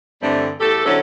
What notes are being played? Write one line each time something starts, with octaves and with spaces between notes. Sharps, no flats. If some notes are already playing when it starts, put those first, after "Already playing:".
G2 D3 E3 G3 A3 C4
E2 A3 G4 A4
D3 F#3 C4 C#4 E4 A4